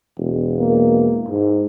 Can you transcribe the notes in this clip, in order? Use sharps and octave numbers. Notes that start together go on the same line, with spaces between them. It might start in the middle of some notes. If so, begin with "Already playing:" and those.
E1
A#3
G#2